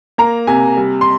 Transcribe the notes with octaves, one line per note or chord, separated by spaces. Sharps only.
A#3 A#5
C3 G#5
G3
C6